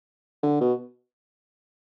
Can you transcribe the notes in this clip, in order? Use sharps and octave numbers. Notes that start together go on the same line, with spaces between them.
D3
B2